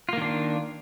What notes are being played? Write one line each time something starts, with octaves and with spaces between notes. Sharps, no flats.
D#3 A#3 D4 F4